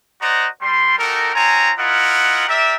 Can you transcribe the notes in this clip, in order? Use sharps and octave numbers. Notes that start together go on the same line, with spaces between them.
F#4 C5 D5 D#5 F#5 A#5
G3 C6
D#4 F#4 G4 A4 A#4
C4 F4 C#5 G#5 A#5
E4 F4 A#4 D#5 F#5
G4 A#4 D5 E5